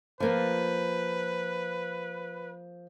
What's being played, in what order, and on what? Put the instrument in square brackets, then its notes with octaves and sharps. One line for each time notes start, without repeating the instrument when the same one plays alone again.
[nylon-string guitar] F3 A#3 F4 [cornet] B4